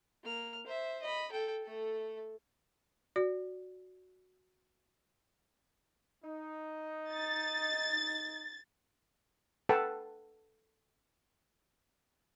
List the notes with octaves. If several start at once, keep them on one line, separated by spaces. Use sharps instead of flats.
A#3 F6
C5 E5
D#5 B5
A4 G5
A3 A4
F#4 D5
D#4
A6
A4 B4 F#5 G5 A5